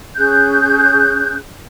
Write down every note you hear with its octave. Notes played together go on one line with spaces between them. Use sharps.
C#4 G#4 F#6 G6